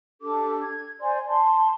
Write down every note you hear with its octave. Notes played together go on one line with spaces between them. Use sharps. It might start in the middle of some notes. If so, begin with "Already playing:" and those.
D4 G4 A4 D6
G#6
C5 D5 G#5 C6
A5 C6